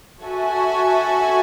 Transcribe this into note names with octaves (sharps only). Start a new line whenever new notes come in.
F#4 A4 E5 G#5